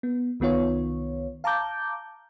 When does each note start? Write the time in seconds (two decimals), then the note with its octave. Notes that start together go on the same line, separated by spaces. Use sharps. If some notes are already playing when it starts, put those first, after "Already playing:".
0.03 B3
0.40 C2 D#3 B3 F4 C#5
1.44 F5 A5 A#5 D6 G6